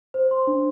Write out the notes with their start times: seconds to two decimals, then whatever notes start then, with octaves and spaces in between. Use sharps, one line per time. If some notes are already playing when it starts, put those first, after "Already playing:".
0.14 C5
0.31 C6
0.47 D4